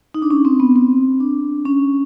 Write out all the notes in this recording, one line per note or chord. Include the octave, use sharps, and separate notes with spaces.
D#4
D4
C#4
C4
B3
C4
D4
C#4